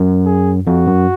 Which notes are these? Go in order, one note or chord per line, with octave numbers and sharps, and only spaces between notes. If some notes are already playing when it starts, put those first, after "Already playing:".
Already playing: F#2
G#4
F2 F#4
F#2